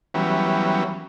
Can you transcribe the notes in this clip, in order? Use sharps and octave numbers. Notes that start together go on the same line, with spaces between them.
E3 F#3 G3 B3 C#4